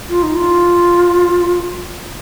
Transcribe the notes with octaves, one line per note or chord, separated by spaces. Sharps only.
F4
D#4
F4